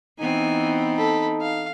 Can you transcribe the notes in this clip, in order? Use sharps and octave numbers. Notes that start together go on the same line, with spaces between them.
E3 B3 C4 D#4 G#5
A4 B5
F5